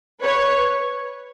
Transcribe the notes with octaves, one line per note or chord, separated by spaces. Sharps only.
B4 C#5